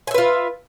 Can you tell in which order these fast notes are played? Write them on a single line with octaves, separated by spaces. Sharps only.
G#5 E5 B4 F4